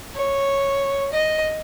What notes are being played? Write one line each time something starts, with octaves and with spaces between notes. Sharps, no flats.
C#5
D#5